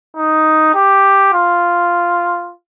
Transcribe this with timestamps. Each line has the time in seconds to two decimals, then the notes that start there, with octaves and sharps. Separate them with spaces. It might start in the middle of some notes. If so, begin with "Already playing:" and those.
0.17 D#4
0.75 G4
1.34 F4